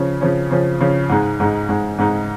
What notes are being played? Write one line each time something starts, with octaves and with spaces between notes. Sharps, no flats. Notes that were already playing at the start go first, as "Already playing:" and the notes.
Already playing: C#3 F3 C#4
C#3 F3 C#4
C#3 F3 C#4
C#3 F3 C#4
G#2 G#3 D#4
G#2 G#3 D#4
G#2 G#3 D#4
G#2 G#3 D#4